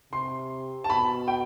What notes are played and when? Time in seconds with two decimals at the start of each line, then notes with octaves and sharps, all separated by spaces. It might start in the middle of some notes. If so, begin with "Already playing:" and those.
0.12 C3 C6
0.84 A5
0.89 B2 B5
1.28 G5